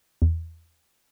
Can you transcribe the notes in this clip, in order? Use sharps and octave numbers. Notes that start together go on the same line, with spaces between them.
E2